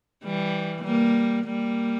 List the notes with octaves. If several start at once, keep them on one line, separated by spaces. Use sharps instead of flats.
E3 G3
G3 A#3
G3 A#3